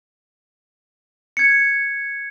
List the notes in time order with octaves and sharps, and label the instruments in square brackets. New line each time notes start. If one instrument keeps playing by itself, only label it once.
[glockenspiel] G#6 C#7